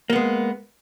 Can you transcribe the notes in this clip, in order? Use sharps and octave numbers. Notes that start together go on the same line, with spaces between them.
G#3 A#3 B3